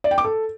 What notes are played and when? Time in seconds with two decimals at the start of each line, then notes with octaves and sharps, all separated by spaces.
0.04 D5
0.11 G5
0.18 D6
0.25 A4